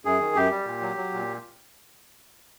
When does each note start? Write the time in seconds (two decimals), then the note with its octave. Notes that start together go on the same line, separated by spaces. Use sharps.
0.05 F#2 G#4
0.20 D#3
0.35 F#2 G4
0.51 G3
0.67 A#2
0.81 F#3
0.97 F#3
1.13 A#2